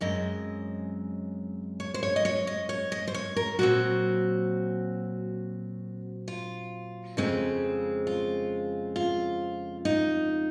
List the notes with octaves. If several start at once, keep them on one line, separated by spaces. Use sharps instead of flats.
F#2 C#3 G#3 C4 D#5
C#5
C5
C#5
D#5
C#5
D#5
C#5
D#5
C5
C#5
A#4
A#2 F#3 C4 F#4
F4
F2 C#3 G#3 C4
F4
F4
D#4